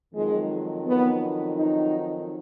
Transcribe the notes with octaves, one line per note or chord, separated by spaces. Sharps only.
F2 D#3 F#3 G#3
B3
D#4